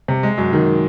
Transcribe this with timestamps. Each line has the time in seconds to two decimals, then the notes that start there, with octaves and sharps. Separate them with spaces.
0.08 C3
0.23 G#3
0.38 F#2
0.53 D#3